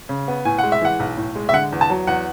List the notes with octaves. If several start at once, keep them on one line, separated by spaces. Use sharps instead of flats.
C#3
B3
A2 G#5
G#3 F#5
E5
E3 F#5
B1
A2
G#3
E5
D3 F#5
E2
A5
F#3
E2 F#5